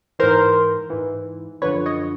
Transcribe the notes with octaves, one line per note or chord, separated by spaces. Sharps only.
G#2 E3 A#4 C5
G#2 E3
F#2 D3 F3 B4 C#5
C#5 D#5